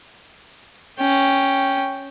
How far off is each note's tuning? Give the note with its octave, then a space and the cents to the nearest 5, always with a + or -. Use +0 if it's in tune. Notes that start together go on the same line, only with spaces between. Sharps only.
C#4 +0 G5 +0